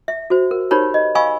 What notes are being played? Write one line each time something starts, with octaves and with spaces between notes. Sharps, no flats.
E5
F#4 C5
A#4
D#4 G4 A#4 C5 C#5 B5
D#5
D#5 F5 G#5 B5 C#6 E6